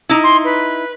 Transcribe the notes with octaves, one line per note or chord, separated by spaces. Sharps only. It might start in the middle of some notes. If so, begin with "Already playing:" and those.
D#4 E4
C6
B4